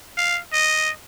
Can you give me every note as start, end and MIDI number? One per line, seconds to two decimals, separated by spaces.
0.17 0.40 77
0.53 0.91 75